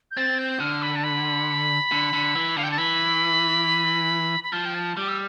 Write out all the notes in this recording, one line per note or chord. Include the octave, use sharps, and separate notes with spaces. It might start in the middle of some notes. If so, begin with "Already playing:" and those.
G6
C4 A6
G6
D3 F6
B5
A5
B5
D3
D3
E3
D3 F5
G5
A5
E3 B5
B5
F3 A5
G5
A5
G3 D6
E6